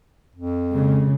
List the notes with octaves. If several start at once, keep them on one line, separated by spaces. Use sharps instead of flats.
F2
A#2 C#3 G#3